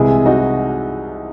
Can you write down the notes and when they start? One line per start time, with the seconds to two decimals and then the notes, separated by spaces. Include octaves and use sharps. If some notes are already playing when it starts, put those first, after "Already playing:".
Already playing: C2 C3 E3 G#3 E4 G#4
0.26 D#4 F#4